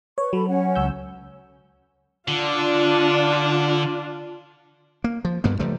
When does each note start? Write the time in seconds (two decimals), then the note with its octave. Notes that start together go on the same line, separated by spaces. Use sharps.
0.18 B4 C#5 C#6
0.33 F#3 A4 B5
0.48 C#4 C#5 F#5
0.75 C#2 E6 G6
2.28 D3 D4 F4
5.04 A#3
5.25 F3
5.44 D2 G2 A#3 B3
5.59 C#2 F3 G3 A3